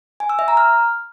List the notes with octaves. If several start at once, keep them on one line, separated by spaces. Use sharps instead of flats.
G#5
E6
E5
A#5
F6